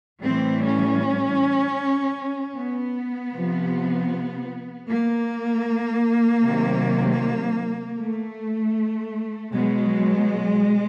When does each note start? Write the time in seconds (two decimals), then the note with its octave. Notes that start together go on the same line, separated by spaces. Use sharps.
0.22 A2 E3 G3 C4
0.60 C#4
2.55 B3
3.32 C3 F3
4.87 A#3
6.43 C3 D#3 F#3
7.99 A3
9.53 B2 F#3 G#3